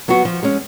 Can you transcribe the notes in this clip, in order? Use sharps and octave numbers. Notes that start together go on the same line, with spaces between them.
F#3 B3 F#4
F3
G#3 C#4